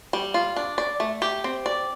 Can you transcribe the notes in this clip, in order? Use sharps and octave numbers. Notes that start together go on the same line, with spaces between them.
G3
F4
D4
D5
A3
G4
C4
D5